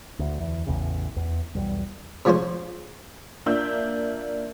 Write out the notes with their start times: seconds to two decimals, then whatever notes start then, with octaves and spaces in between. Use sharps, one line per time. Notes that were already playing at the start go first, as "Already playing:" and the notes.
0.19 D2
0.40 E2
0.67 A1 E2 A2 C#3
1.16 E2
1.55 B1 E2 G3
2.25 C3 F3 G#3 C#4 C5
3.46 A#3 D4 F4 E5 E6 G6